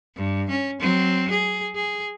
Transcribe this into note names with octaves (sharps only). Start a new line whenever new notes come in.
G2
C#4
F#3 C4
G#4
G#4